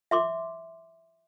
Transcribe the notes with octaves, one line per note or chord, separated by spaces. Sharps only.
E5 C6 D6